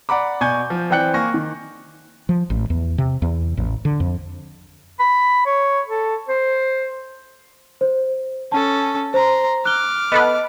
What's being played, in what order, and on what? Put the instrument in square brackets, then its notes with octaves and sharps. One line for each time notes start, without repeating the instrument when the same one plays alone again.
[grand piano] D5 F#5 A#5 B5 D6
B2 D5 G#5 C#6 G6 G#6
F3
E3 C4 D5 G5 F#6 C#7
A#3 G#5 C#6 A#6
D#3
[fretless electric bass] F3
A1
E2
C3
E2
A1
D3
F2
[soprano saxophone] B5
C#5
A4
C5
[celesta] C5
[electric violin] C#4 A4 [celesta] A5
[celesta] C5 [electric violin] A#5 C6
[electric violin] D6 F6 [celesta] F#6 G7
[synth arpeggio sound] B3 A4 B4 [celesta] D#5